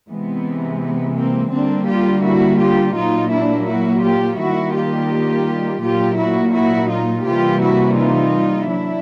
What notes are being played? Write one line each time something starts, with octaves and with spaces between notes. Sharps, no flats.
C3 E3 G#3 B3
B3
A#3 C4
D3 G3 A#3 C4 D4
F4 G4
E4 F#4
F4 G4
A#2 F#3 A#3 D#4 F4
D4 E4
E4 F#4
F4 G4
D#3 G3 A#3 E4 F#4
F4 G4
A#2 F#3 A#3 F4 G4
E4 F#4
E4 F#4
D#4 F4
C3 E3 G3 A#3 F4 G4
E4 F#4
D#4 F4
F#3 D4 E4